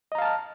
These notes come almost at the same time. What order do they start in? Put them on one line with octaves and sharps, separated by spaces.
D#5 A#5 F5 A5 F6